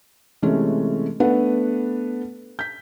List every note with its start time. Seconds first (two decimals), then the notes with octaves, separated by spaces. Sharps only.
0.42 C3 E3 G#3 A3 C#4
1.20 A3 B3 D4 B4 F#5
2.59 G6 B6